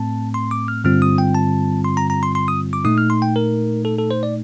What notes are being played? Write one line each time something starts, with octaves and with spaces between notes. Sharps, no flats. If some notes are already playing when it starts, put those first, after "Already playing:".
Already playing: A2 A3 C4 A5
C6
D6
F6
G2 D3 G3 C4 F4 F6
D#6
G5
A5
C6
A#5
A#5
C6
C6
D#6
D6
A#2 A3 D#4 D#6
F6
C6
G5
A#4
A4
A4
C5
D5